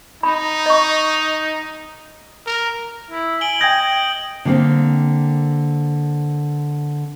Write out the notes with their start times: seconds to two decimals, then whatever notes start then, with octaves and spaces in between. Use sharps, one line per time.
0.23 D#4 B5
0.66 D#5 C#6
2.46 A#4
3.11 E4
3.41 G#5 D7 F#7 G7
3.61 D#5 G5 G6 G#6 A#6
4.45 D3 A#3 C4